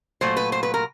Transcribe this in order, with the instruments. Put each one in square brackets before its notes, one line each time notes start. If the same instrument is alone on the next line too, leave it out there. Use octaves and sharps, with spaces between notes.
[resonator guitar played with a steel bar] A#2 F#3 A3 C5
B4
C5
B4
A#4